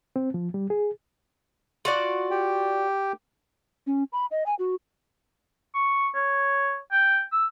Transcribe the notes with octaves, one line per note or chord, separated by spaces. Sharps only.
C4
F3
G3
G#4
F4 F#4 D5
G4 G5
C#4
B5
D#5
G#5
F#4
C#6
C#5
G5
E6